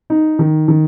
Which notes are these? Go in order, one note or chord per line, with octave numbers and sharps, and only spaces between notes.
D#4
D#3
D#3